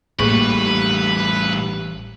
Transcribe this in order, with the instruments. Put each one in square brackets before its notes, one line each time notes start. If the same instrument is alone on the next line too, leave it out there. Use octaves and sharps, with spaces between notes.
[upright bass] A1 [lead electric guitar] A2 G3 [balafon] A#3 G#4 C#6 [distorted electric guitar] B4